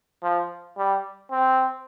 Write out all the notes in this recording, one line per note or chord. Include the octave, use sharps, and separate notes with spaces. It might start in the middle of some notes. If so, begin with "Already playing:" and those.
F3
G3
C4